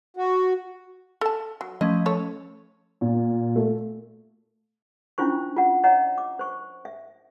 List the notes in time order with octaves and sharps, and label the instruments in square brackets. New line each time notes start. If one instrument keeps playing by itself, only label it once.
[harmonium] F#4
[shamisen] A4 A5
F#3
[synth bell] F3 A3 C#4 [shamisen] D#5
[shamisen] A4 C#5
[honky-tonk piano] A#2
A3
[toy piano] C#4 D4 E4 F4 C5 C#6
F4 F#5
C#5 D#5 E5 F#5 A#5
D6
C5 C#6
E5